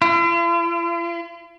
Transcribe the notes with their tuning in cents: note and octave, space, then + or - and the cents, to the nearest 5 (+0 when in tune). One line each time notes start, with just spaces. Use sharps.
F4 -45